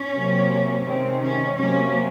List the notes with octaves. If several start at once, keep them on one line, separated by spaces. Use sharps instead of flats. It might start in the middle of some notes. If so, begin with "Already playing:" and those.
Already playing: C#4
C3 F#3 A#3
C3 D#3 G#3 C4
C#4
C3 F#3 A#3 C#4